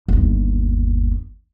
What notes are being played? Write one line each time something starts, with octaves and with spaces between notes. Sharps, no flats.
G1 D#2